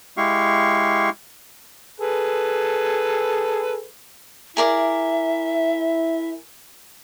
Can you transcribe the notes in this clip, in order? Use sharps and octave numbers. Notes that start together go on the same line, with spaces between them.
G#3 E4 G4 F5 C#6
G#4 A4 B4
E4 G#4 A#4 D5 E5